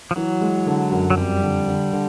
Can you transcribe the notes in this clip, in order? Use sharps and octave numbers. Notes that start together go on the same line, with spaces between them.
F3
E3 F#3
G#3
D3
F#2
F#3
F2 G3
D3
D3
D3